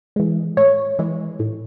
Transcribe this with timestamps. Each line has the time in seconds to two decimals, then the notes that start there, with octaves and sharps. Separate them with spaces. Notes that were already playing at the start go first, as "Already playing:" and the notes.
0.16 E3 G#3
0.57 A2 C#5
0.99 E3 G#3
1.39 A2